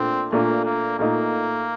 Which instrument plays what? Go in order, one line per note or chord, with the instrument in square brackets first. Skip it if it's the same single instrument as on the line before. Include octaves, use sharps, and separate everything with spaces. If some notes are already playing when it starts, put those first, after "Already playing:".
Already playing: [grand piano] A#2 A3 D4 [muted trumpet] C4
[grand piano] A#2 A3 D4 [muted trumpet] A#3
[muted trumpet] A#3
[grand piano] A#2 A3 D#4 [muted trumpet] A#3